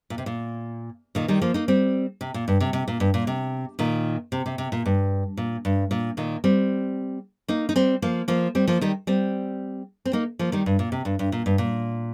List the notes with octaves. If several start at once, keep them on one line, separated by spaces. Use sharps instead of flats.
A#2
C3
A#2
A#2 D#3
D#3 G3
F3 A#3
A#3 D#4
G3 C4
C3
A#2
G2
C3
C3
A#2
G2
A#2
C3
A#2 D#3
C3
C3
C3
A#2
G2
A#2
G2
A#2
A#2 D#3
G3 C4
A#3 D#4
D#4
G3 C4
F3 A#3
F3 A#3
G3 C4
F3 A#3
D#3 G3
G3 C4
C4
A#3 D#4
F3 A#3
D#3 G3
G2
A#2
C3
G2
G2
A#2
G2
A#2